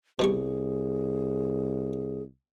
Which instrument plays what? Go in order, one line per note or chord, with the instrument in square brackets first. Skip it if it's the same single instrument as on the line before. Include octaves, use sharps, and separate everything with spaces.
[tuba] C2 [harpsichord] B2 G3 C#6 [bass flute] G#4